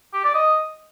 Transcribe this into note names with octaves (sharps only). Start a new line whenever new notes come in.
G4
D5
D#5